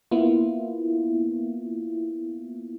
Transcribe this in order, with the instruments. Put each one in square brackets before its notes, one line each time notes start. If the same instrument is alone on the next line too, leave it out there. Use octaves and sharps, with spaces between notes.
[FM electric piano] A#3 B3 E4 F4